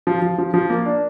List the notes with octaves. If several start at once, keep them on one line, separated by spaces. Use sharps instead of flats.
F3
F3
F3
F3
A#3
D4